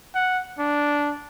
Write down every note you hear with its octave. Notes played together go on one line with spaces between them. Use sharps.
F#5
D4